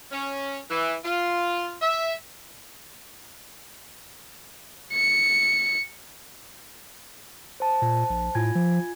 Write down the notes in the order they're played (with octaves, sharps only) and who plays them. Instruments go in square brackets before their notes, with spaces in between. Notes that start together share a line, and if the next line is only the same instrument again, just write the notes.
[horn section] C#4
E3
F4
E5
[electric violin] C#7
[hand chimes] C5 A5
[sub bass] A#2
A#1
[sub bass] A2 [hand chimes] F4 G#5 G#6
[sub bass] F3